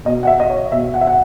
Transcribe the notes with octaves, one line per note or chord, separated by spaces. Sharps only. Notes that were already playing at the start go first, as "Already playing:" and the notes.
B2 D#5
F#5
E5
D#5
C#5
B2 E5
F#5
E5
F#5